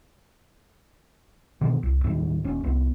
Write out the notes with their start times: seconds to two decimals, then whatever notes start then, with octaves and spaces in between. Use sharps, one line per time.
1.61 B2 D3 D#3 F3
1.83 C2
2.04 D#2 A2 D#3 G3
2.44 D#1 C#4
2.64 C2 B3